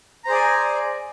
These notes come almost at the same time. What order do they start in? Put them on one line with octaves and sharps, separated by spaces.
A#5 C5 G#4 D5 G#5